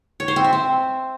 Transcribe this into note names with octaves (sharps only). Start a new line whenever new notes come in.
C#5
C5
C4
E5
C4